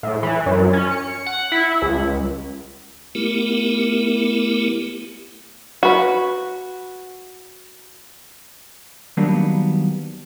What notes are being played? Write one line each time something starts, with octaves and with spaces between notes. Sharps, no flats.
A2
E3
F#2
C#4
C#7
F#5
E4
C#2
A3 B3 E4 G4 A#4
F#4 B4
D#3 F#3 G3 A#3 B3 D4